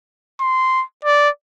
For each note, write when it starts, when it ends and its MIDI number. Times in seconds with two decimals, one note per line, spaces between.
0.41 0.83 84
1.05 1.29 74